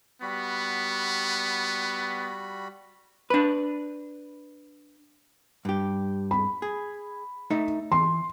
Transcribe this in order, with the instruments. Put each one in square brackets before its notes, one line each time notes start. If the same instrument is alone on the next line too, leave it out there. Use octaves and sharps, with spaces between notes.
[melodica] G3 F#4 B5 [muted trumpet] B3
[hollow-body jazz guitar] D4 B4
G2 G4
[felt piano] B5
[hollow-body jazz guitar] G#4
A3 D#4 E5
[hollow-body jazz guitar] E3 [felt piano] C6